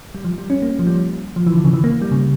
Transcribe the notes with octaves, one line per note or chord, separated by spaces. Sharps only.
G3
F3
G3
C#4
A#3
F3
G3
F3
E3
D3
C#3
E3
A#3
G3
C#3